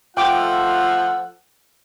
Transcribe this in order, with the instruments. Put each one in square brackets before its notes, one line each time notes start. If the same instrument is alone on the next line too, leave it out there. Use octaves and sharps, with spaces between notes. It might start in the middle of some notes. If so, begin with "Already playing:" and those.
[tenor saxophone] F3 [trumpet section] A3 A4 F#5 [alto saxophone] F4 [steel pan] G5 D6